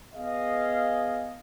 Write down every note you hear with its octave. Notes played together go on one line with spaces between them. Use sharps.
B3 G#4 D#5 F5